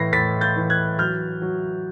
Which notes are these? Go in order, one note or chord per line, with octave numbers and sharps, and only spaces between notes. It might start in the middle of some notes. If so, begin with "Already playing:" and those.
Already playing: A2 E3 A#6 C7
A2 A6 B6
G6 A6
E3
F#6 G#6
F#3 F6 G6
F#3